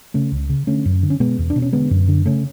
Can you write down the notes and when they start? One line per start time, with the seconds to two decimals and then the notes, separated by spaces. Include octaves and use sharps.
0.14 C#3 A3 C#4
0.32 C#2
0.49 C#3
0.67 D3 A3 C#4
0.85 F#2
1.03 D3
1.10 C#4
1.20 B2 G#3 B3
1.39 E2
1.50 D4
1.56 B2
1.62 C#4
1.73 D3 G#3 B3
1.91 F#2
2.08 D3
2.26 C#3 A3 C#4